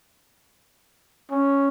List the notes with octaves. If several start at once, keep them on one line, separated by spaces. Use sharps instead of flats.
C#4